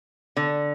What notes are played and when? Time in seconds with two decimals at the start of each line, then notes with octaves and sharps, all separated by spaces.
0.37 D3